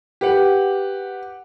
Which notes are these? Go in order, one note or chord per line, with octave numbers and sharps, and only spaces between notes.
G4 B4 F#5